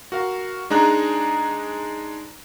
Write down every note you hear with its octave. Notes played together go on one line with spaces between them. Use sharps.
F#4 A#4 F5
G#3 D4 D#4 G#4 A#5 F#6